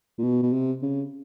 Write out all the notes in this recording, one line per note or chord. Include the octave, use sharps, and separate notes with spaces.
A#2
B2
B2
C3
C#3